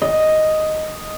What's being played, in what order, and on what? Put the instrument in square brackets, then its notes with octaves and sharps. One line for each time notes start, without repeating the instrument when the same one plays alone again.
[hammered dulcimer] D#5